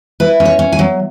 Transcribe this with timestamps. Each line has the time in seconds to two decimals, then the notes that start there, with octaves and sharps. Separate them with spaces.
0.20 E4 B4
0.40 C#4
0.45 C#5
0.59 C#4
0.72 G#5
0.79 F#3